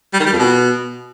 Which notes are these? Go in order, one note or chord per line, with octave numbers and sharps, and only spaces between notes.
G3
D#3
G3
F2
B2